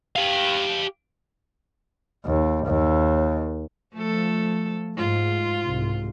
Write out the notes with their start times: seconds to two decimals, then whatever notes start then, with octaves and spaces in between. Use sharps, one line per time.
0.16 G4 F5
2.26 D#2
2.66 D#2
3.94 F3 A3 A4
4.98 G#2 F4
5.64 C2 G#2